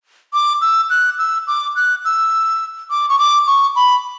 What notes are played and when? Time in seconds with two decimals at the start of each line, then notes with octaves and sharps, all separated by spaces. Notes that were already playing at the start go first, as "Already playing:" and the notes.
0.33 D6
0.61 E6
0.90 F#6
1.18 E6
1.47 D6
1.76 F#6
2.05 E6
2.90 D6
3.09 C#6
3.19 D6
3.47 C#6
3.76 B5